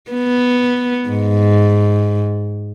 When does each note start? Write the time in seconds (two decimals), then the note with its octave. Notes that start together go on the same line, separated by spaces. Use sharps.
0.11 B3
1.09 G#2